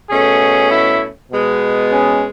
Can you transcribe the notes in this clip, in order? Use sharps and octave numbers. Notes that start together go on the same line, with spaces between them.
B2 A3 C#4 G#4
E4
B2 G#3 B3
C#4